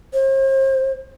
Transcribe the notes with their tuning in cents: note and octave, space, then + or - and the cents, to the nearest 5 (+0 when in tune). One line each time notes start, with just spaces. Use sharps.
C5 +45